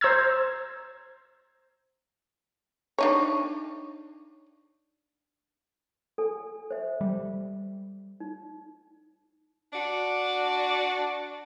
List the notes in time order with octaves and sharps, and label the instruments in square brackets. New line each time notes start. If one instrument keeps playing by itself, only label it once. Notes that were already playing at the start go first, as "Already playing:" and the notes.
[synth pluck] C5 A#5 E6 G#6
[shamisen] D4 D#4 C#5
[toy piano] A4 G#5
C5 E5
[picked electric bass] G3
[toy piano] D#4
[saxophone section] D4 F#4 D5